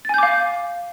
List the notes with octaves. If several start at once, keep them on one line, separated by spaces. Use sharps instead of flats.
F5 G#5 D6 G6 A6